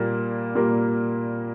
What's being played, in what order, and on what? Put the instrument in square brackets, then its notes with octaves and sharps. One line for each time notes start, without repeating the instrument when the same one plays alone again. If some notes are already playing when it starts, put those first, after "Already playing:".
Already playing: [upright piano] A#2 G3 A#3
A#2 G3 A#3